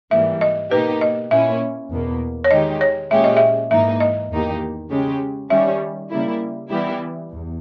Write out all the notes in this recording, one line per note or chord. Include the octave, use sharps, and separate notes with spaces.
G#2 E3 G3 A#3 E5
D#5
B2 A#3 D#4 G4 B4
D#5
A#2 A#3 C#4 E4 E5
E2 B2 A#3
C#5
D#3 G#3 D#4 G4 D#5
C#5
A#2 G#3 C#4 G4 E5
D#5
E5
G#2 E3 A#3 D#4 E5
D#5
E2 D#3 A#3 D#4 G4
C#3 G#3 C#4 G4
D#3 G3 C#4 E5
C#3 G3 A#3 E4
E3 G3 B3 E4 G4
E2